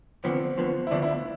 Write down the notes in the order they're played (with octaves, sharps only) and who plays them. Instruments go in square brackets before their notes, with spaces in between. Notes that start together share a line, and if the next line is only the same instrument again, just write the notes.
[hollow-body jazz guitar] D2 D3 F3 B3 [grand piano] C4
[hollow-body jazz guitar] D2 D3 F3 B3
[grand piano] E4
[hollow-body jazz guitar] D2 D3 F3 B3 [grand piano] D4
[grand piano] E4
E4